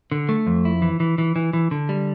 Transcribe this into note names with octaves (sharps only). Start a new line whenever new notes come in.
D3
A3
F2
E4
E3
E3
E3
E3
E3
D3
G3